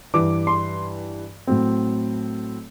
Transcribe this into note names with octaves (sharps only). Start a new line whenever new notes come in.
G2 E3 G3 D6
C6
A2 F#3 C4